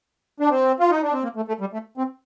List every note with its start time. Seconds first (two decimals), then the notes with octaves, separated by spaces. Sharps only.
0.40 D4
0.50 C4
0.80 F4
0.90 D#4
1.02 D4
1.12 C4
1.23 A#3
1.36 A3
1.48 A3
1.61 G3
1.73 A3
1.98 C4